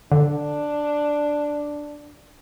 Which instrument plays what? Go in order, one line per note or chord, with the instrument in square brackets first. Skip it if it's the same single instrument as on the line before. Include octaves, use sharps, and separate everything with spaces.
[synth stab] D3 [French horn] D4